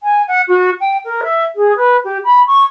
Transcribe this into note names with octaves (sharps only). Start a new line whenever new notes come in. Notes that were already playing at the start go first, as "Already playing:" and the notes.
G#5
F#5
F#4
G5
A#4
E5
G#4
B4
G4
B5
C#6